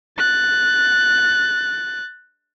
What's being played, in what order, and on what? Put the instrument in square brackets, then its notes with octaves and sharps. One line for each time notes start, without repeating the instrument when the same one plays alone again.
[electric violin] F#6 A6